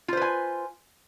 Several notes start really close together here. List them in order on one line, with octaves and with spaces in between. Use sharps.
F4 C5 B4 G#5